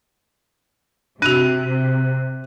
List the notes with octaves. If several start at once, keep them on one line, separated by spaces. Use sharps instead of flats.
C3 D4 F#4 F#6 D#7